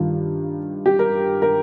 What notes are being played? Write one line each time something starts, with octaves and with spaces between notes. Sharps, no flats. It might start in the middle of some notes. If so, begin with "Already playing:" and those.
Already playing: G2 D#3 F4
G4
A#4
A#4